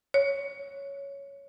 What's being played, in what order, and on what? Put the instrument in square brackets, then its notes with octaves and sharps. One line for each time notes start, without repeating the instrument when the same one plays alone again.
[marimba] C#5